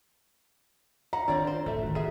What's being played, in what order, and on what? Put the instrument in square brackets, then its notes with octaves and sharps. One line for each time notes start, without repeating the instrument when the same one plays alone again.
[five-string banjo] F#5 [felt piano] A#5
[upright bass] D#3 [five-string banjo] C4 C#5 D5 [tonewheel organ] D4 F4
[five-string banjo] C5
[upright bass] A2 [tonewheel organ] D3 [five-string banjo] A3 E5
[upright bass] D#3 E4 [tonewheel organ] F#4
[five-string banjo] G#4 E5